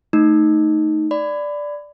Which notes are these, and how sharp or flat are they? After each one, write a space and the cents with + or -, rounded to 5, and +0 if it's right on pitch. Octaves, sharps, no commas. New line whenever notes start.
A3 +0 D#4 +0
D5 +0 B5 +25